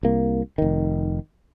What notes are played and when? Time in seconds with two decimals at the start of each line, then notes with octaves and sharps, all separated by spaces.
0.03 C2 A#3
0.58 F1 D#3